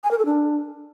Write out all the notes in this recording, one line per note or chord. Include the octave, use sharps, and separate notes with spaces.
G#5
A#4
A4
D4